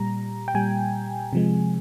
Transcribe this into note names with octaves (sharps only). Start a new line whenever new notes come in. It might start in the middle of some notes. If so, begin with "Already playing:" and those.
Already playing: A#2 G3 A#5
G5
A#2 G3 G#5
C3 F3 G#3